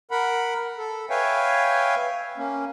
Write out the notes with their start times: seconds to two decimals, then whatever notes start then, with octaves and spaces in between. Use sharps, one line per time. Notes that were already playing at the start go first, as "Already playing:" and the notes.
0.11 A#4 F#5 B5
0.78 A4
1.10 B4 C#5 E5 F5 G5 G#5
2.37 A#3 C#4